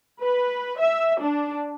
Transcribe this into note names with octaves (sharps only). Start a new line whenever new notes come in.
B4
E5
D4